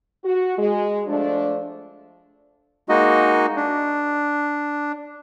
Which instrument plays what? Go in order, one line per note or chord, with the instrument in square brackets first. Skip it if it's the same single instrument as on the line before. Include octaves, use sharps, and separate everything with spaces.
[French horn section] F#4
G#3
F3 A3 D4
[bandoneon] G#3 A#3 D#4 F#4 D#5
D4